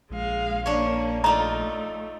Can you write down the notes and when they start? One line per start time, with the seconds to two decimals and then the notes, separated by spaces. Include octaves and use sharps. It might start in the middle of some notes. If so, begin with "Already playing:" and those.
0.10 A#1 G#3 F5
0.66 A#3 C#4 D4 C#5
1.24 A3 D#4 F4 D5 A#5